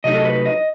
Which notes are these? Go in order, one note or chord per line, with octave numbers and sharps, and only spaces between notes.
C3 F#3 A3 D#4 D#5
A4
B4
D#5